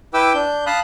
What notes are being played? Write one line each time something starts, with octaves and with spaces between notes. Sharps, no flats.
E4 B4 G5 D6 E6
D4 G6
F5 A5 B5 D#6 F#6